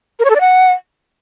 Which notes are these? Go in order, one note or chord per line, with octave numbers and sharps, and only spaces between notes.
A#4
C#5
A4
D5
F#5